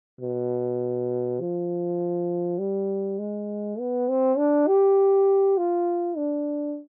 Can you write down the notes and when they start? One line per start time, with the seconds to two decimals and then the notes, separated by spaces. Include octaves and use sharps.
0.21 B2
1.41 F3
2.59 G3
3.19 G#3
3.79 B3
4.09 C4
4.38 D4
4.67 G4
5.57 F4
6.17 D4